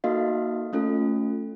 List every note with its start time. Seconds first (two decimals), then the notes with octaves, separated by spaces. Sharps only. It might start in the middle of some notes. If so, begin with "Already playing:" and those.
0.04 A#3 D#4 F#4 A4 D#5 F5
0.73 A3 C#4 F4 A4